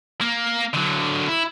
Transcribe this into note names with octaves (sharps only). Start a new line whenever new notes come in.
A#3
D3 F#3
E4